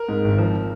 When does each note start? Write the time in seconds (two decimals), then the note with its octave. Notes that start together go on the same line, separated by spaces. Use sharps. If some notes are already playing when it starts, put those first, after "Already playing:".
Already playing: A#4
0.08 G#2
0.24 G#1
0.38 F3